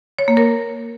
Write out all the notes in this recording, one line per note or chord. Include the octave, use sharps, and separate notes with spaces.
C#5
A#3
A#4